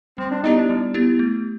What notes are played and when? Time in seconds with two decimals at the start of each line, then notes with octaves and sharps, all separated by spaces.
0.18 G3 C4
0.31 D4
0.43 B3 D#4 E4 G4
0.57 D4
0.70 G3
0.94 B3 E4 G4
1.19 A3